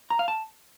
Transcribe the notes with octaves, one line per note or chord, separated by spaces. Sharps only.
A#5
F5
A5